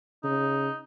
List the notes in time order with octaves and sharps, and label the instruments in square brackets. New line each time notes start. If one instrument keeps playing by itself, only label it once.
[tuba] C#3 [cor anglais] D#4